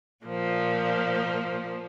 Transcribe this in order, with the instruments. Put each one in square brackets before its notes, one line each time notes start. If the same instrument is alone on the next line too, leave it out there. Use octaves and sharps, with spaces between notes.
[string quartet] A#2 F3 A#3